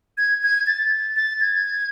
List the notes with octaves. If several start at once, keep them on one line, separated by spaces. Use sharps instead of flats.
G#6
G#6
A6
A6
G#6